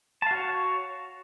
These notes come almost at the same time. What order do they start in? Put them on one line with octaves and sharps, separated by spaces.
A5 F5 F#4 C#5